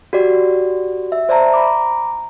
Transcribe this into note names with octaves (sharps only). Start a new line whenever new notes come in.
F#4 G4 D5
E5
C5 D5 E5 A5 A#5
A#5 B5 D6